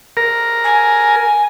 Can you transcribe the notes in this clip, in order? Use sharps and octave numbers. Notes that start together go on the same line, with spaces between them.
A#4
G#5